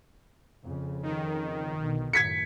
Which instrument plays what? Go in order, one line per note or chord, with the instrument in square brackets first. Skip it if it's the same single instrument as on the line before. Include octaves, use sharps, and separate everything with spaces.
[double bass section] F2 C#3
[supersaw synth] D#3
[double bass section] B1 B2 D3
[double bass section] F#2 A2 D#3 [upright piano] G#6 B6 C#7